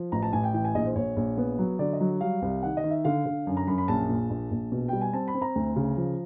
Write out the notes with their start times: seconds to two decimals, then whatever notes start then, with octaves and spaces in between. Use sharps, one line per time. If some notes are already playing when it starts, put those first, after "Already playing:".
Already playing: F3
0.12 A1 A#5
0.22 A5
0.33 A1 G#5
0.43 G5
0.54 E3 G5
0.65 G#5
0.75 A#1 D#5
0.85 C5
0.96 A#1 C#5
1.16 A#1
1.37 B3
1.58 F#3
1.79 D3 D5
1.93 D#5
2.00 F#3
2.21 G3 F5
2.42 C2
2.63 D#3 F#5
2.77 D#5
2.84 D#3
2.90 E5
3.04 D3 F5
3.26 D3
3.47 F#2
3.57 A#5
3.67 F#2 B5
3.78 B5
3.88 A#1 A5
4.09 A#2
4.30 A#1
4.51 A#1
4.72 B2
4.88 G3 G5
5.01 G#5
5.13 C4 A5
5.28 B5
5.34 C4
5.42 A#5
5.56 D2
5.76 C#3
5.97 F3